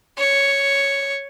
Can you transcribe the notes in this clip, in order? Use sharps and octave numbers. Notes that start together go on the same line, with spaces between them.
C#5